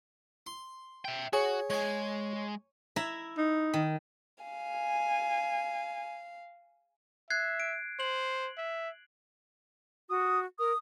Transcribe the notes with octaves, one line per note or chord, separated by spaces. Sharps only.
C6
E5 G5
F#4 G#4 C#5
G#3 C#5 G#5
E4 E5 A#5
D#4
D#3
F5 G#5
E5 F#6 G#6 C7
D7
C5 F#7
E5
F#4 D#6
A#4 D#6